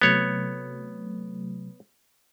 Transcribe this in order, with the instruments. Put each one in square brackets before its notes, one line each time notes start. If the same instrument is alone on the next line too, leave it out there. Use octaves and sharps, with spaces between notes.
[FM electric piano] C3 F#3 A3 [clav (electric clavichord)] B3 C#5